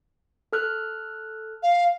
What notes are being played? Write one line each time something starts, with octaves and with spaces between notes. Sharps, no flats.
A4 F6 F#6
F5